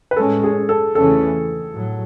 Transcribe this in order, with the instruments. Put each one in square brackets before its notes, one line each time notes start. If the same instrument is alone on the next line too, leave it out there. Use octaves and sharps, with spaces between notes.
[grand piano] B4
[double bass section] A2 G#3 C#4 [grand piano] A4
[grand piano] G#4
A4
[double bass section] E2 C#3 E3 A3 C#4 [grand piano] A4
[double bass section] A2 F#3